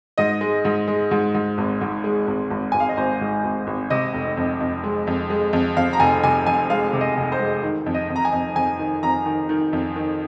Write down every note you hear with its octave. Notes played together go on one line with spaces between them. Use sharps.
G#2 D#5
G#3
G#2
G#3
G#2
G#2
G#1
G#2
G#3
G#1
G#1
G#1 G#5
F5
D#5
G#1 C5
G#2
G#1
G#1
C3 D#5
F1
F2
F2
G#3
F2
G#3
F2
F2 F5
A#5
F1 G#5
C3 G#5
F2 G#5
G#3 F5
C3
D#5
F1
C5
G#3
D#3
F2
D#5
F2
A#5
G#5
F2
F2 G#5
D#3
F2 A#5
D#3
D#3
F2
D#3